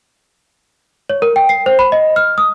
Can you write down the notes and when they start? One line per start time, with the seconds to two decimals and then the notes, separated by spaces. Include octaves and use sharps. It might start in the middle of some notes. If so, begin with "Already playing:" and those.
1.10 C#5
1.22 A#4
1.36 G5
1.49 C7
1.66 C5
1.79 B5
1.92 D#5
2.16 F6
2.38 D#6